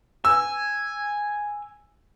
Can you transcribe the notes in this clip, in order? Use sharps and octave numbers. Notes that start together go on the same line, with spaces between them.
G#5 E6